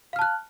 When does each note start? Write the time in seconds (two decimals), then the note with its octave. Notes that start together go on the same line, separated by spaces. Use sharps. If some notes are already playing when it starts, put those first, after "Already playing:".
0.13 F5
0.16 F6
0.19 A5
0.22 F#6